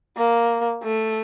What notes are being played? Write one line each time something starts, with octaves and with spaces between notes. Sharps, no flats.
A#3
A3